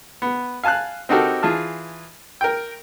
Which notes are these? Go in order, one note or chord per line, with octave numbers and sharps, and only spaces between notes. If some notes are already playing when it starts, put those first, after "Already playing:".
B3
F5 G#5 A5 F6 F#6
C4 D#4 F#4 G4 A4 A#4
E3 F4 G#4 A5 F6
A#4 G5